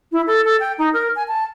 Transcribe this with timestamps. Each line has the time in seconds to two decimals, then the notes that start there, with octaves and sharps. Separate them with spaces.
0.12 E4
0.27 A4
0.45 A4
0.60 G5
0.78 D#4
0.94 A#4
1.16 G#5
1.28 A5